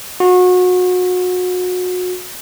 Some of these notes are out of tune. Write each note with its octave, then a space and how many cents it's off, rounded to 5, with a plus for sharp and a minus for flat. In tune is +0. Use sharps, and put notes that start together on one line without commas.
F#4 -30